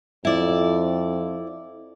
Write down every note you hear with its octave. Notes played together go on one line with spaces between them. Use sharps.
F2 E4 D5